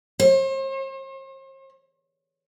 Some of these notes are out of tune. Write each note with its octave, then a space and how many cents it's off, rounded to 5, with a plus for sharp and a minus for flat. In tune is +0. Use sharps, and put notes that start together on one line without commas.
C5 +45